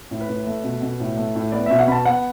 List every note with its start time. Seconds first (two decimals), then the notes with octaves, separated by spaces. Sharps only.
0.11 A2
0.21 B4
0.29 A2
0.47 A3
0.64 B2
0.82 B2
1.00 A2
1.17 A3
1.35 A2
1.52 B3 D5
1.66 B2 E5
1.79 F#5
1.87 B2 B5
1.92 A5
2.05 B3 F#5